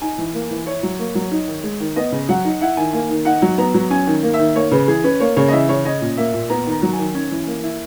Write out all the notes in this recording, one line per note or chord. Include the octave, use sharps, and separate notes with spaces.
D#4 G#5
E3
A#3
E3
E4 C#5
F#3
A#3
F#3
D#4
D#3
G#3
D#3
B3 D#5
C#3
F#3 F#5
D#4
E4 F#5
D#3 G#5
A#3 G#5
D#3
D#4 F#5
F#3
B3 A#5
F#3
C#4 G#5
D#3
A#3
E5
D#3
A#3 C#5
C#3 B4
E3 G#4
C#4 B4
A#3 C#5
C#3 C#5
D#5
E3 E5
C#3 C#5
C#4 D#5
A#2
A#3 E5
A#2
B3 A#5
D#3
A#5
F#3
G#5
D#3
C#4
E3
A#3
E4